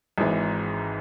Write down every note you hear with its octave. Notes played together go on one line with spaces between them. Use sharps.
G#1 G#2 E3